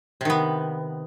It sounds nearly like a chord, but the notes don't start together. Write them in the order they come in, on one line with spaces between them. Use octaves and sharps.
C3 D#3 B3